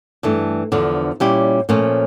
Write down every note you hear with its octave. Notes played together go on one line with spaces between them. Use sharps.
G2 E3 A3
E2 D3 F3
A#2 G3 C#4 E4 G4
A#2 F3 A3 C#4